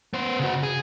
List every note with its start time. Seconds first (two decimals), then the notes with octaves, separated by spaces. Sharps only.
0.14 B3 C5
0.39 C#3 F#4
0.63 G#4